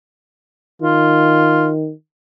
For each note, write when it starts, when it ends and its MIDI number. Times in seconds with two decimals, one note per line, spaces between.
0.82 1.92 51
0.82 1.71 65